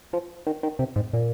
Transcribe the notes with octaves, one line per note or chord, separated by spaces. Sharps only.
F3
D#3
D#3
C3
G#2
A#2